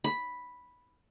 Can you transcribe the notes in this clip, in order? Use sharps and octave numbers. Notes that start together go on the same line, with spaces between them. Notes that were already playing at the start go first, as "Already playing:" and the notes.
B5